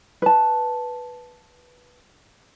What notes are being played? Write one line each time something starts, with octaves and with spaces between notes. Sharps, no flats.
B4 A5